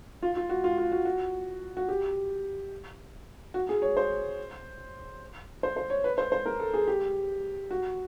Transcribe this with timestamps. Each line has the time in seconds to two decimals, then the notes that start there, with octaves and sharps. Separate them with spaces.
0.22 F4
0.36 F4
0.49 F#4
0.64 F4
0.78 F4
0.92 F#4
1.05 F#4
1.77 F#4
1.89 G4
3.54 F#4
3.69 G#4
3.82 C#5
3.97 C5
5.63 C5
5.77 C5
5.90 C#5
6.04 B4
6.18 C5
6.32 C5
6.46 A#4
6.60 A4
6.74 G#4
6.88 G4
7.71 F#4